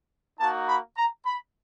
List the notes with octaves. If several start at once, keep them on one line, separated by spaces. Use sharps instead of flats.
A#3 D#4 F#4 A5
B5
A#5
B5